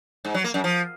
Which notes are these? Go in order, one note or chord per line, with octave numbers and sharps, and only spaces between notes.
G#2
F#3
A#3
F#2
F3